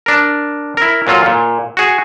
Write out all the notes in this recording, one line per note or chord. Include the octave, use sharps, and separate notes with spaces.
D4 A#4
E4 A#4
A#2 F#3 F4 A4
A#2
F#4 G#4